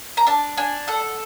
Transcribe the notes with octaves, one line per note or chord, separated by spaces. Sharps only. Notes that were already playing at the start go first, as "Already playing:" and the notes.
A#5
D4 A5
D4 G#5
A4 F#5